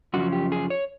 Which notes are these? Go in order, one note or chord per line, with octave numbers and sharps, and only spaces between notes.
F#2 C#3 F3 F#4
G4
G#4
C#5